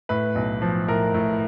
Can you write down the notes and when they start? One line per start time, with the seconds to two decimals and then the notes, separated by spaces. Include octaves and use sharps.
0.09 A2 B4
0.35 B1
0.62 F3
0.88 A2 A#4
1.14 A2